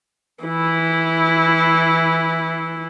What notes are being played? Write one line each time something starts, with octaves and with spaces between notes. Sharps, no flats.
E3 E4